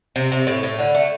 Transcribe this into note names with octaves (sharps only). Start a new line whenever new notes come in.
C3 C4
C3
A2
A2
D3
A3